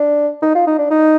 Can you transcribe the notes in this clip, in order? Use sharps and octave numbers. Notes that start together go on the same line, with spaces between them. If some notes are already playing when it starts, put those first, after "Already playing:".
Already playing: D4
D#4
F4
D#4
D4
D#4